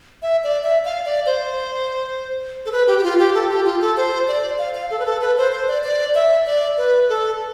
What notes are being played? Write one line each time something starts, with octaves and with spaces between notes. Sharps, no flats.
E5
D5
E5
F5
D5
C5
A4
B4
G4
G4
F4
G4
A4
G4
F4
A4
C5
D5
F5
F5
A4
B4
A4
B4
C5
C5
D5
D5
E5
D5
B4
A4